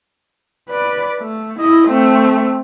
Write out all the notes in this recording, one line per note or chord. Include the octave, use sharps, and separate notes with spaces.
B4 D5
A3
E4 D#5
A3 C4